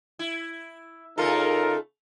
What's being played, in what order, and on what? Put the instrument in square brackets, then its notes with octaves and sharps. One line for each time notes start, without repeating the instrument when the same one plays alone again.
[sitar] E4
[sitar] C#3 A3 A4 [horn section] D#4 F4 A#4